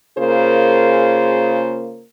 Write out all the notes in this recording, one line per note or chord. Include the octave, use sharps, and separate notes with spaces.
C#3 A#3 F4 G#4 A#4 C5